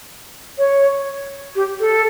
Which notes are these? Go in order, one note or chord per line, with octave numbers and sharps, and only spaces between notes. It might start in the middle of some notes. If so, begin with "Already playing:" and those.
C#5
G4
A4